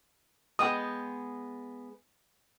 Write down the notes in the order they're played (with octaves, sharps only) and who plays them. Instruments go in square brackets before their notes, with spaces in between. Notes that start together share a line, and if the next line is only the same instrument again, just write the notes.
[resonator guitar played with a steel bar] G#3 B3 G5 [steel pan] D#6